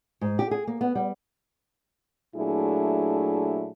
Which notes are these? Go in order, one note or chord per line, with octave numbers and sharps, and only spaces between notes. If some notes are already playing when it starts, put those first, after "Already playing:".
G#2
G4
G#4
A#3
B3
G3
A#2 F#3 A3 D4 E4 G#4